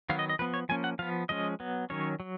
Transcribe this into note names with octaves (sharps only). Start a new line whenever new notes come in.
D#3 F#3 B3 F5
D#5
D#5
F3 B3 B4
C#5
F3 A#3 C#4 G#5
F#5
F3 B3 F5
F3 G#3 C#4 D#5
F#3 B3
D#3 F#3 C#4 C#5
F#3